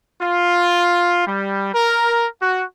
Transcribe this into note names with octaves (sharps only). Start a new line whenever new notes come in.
F4
G3
A#4
F#4